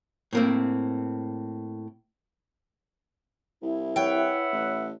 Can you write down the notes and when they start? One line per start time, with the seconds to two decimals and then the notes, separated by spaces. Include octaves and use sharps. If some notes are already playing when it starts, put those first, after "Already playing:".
0.33 A2 A#3 C4
3.62 C2 E4
3.96 B4 C#5 E5 F#5 G5
4.52 A1